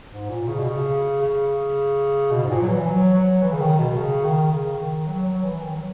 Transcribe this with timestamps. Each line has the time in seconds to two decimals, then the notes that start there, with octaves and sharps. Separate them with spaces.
0.11 G#2
0.29 A#2
0.48 C#3
0.58 B2
0.69 C#3
1.22 C#3
2.31 B2
2.44 G#2
2.50 A#2
2.62 F#3
2.68 E3
2.87 F#3
3.14 F#3
3.42 E3
3.53 C#3
3.60 D#3
3.78 B2
3.97 C#3
4.24 D#3
4.51 C#3
4.79 D#3
5.07 F#3
5.26 F#3
5.44 E3
5.55 E3
5.62 D#3
5.76 F#3